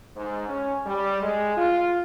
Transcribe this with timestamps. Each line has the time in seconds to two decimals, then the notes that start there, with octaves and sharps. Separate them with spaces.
0.17 G#2
0.49 C#4
0.86 G3
1.21 G#3
1.57 F4